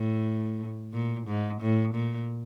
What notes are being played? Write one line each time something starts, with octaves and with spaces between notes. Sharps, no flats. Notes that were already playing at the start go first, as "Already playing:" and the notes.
Already playing: A2
A#2
G#2
A2
A#2